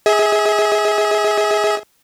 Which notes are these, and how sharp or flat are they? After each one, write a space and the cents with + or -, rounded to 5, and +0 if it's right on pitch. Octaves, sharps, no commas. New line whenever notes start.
G#4 +0 E5 -40